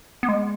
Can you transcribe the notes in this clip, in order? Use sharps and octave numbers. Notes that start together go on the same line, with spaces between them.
B3
G#3